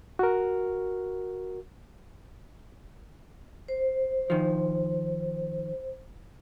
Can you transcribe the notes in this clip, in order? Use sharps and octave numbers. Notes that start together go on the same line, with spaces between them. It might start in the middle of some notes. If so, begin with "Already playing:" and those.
F#4 A#4
C5
D#3 F3